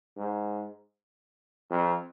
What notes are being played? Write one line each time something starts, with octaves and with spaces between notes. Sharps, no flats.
G#2
F2